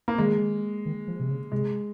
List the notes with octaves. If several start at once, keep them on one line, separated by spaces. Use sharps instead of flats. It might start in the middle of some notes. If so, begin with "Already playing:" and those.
A#3
D#3 G#3
D#3
F3
C3
C#3
C3 G#3